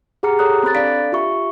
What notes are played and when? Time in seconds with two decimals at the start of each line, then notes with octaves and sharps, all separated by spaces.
0.23 G4 G#4 F#5 A#5 F6 C#7
0.39 G4 A4 C#5 A#5 D#6 F#6
0.63 C4 B5 F#6 A6
0.75 D4 A4 D5 F5 B6 D7
1.12 F4 G4 E5 C#6